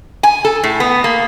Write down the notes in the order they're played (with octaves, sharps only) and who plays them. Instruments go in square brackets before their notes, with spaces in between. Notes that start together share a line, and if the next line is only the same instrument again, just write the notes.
[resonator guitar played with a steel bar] G#5
A4
A2
B3
A#3